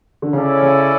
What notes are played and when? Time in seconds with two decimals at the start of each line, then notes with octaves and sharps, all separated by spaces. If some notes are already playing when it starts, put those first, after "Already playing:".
0.22 D3
0.32 C#3 C#4 E4 A4 D5
0.62 C#3